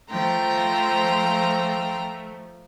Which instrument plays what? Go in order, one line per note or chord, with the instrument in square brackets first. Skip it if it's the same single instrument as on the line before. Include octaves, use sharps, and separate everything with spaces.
[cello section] F3 [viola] A3 [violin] G5 C6 [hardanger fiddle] A#5